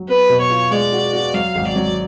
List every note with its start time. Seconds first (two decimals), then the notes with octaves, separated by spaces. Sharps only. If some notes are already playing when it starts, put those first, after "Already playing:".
Already playing: F#3
0.08 B3 B4
0.30 B2
0.40 C#5
0.50 F4
0.71 G#3 D5
0.92 F#4
1.13 F#4
1.34 F#3 F5
1.55 G#1
1.65 D5
1.76 F#3